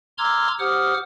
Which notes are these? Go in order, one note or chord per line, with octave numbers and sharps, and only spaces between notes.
A#5 C6 D6 E6 F6 G#6
G4 C5 F#5 D6 D#6 F6